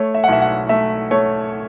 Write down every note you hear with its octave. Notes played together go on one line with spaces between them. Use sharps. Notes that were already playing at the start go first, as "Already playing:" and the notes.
Already playing: A3 C#5
E5
F#5
B1 E5
F#5
A3 E5
A3 C#5